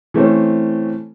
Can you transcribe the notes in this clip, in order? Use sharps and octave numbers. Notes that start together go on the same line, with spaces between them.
E3 A3 C4 C#4